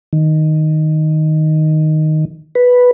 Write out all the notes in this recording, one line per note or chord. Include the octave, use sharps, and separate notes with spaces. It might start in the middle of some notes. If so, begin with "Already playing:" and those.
D#3
B4